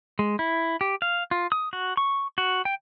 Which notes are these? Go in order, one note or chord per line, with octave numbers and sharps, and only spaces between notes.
G#3
E4
G4
F5
F4
D#6
F#4
C#6
F#4
G5